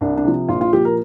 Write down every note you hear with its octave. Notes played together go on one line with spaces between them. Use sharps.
C2 D4
D4
C3 F3
A#1 F4
F4
A#2 F3 G4
A#4